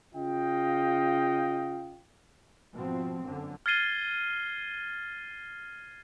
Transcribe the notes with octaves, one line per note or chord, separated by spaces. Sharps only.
C#3 F4 D#5 F5 G5
G#1 B2 F3 C4
G1 F#2 D3
F6 G#6 A6 C7 D#7 G7